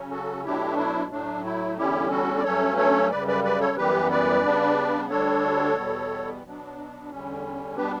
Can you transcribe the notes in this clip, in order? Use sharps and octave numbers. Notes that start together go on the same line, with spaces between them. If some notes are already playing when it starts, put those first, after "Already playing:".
Already playing: C#3 F#3 C#4
F#4 A4
B2 F#3 A3 D4 E4 G4
E4
A2 F#3 A3 D4
E4
E2 D3 G3 C#4 E4 G4
F#4 A4
D5
G2 F#3 A3 C#4 A4 C#5
A4 C#5
F#2 C#3 G3 B4 D5
B4 D5
B4 D5
A4 C#5
F#2 E3 G3 B3 G4 B4
B4 D5
C#3 G3 B3 D4
D2 D3 G3 D4 A4 C#5
E2 B2 G3 B3
B2 F#3 B3 D4
E2 D3 G3 C#4
B2 G3 B3 D4 G4 B4